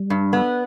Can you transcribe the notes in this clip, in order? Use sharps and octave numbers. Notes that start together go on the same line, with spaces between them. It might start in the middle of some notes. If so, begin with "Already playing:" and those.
Already playing: G3
G2
B3